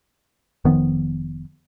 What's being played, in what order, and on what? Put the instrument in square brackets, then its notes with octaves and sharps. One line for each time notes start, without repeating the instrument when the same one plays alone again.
[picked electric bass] F1 D#3 F3 B3